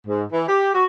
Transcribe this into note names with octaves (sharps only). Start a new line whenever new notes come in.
G#2
E3
G4
F#4